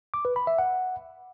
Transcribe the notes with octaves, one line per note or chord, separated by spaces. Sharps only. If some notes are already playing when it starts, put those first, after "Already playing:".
D6
B4
B5
E5
F#5